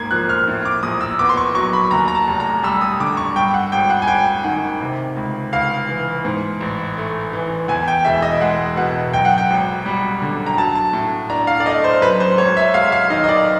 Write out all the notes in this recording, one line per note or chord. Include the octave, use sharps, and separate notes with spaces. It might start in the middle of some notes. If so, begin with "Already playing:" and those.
Already playing: G#1 G#2 A#3 G#6
F3 F#6
F6
A2
D6
A#1 D#6
E6
B3 D6
C6
C#6
F#3 C#6
B5
D#2 A#5
A#5
A5
F1
A#5
G3 E6
D#6
D3 D6
C#6
G2 G5
F#5
G#1 G5
F#5
G#5
G#1 G5
D#3 F#5
C3
C#2
C#2 F5
E3
G#2
A1
A3
E3
E2 G#5
G5
E1 E5
D#5
G#3 F#5
B2 F#5
F#2 G5
F#5
G5
G#1
G3
D3
A#5
F#3 A5
A5
A2
D4 A#5
F5
D5
A3 D#5
C5
F#2 B4
C5
G#1 C#5
E5
G#3 F5
F5
D#3 D#5
D#5
D5